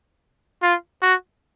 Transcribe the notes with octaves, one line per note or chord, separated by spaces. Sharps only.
F4
F#4